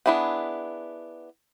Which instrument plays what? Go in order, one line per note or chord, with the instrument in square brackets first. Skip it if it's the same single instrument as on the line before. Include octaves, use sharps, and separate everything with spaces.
[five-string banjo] B3 D4 E4 G#4 F#5